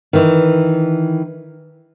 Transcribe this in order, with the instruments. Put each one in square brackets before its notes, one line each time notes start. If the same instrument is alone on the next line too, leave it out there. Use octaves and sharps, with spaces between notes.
[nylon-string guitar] D#3 E3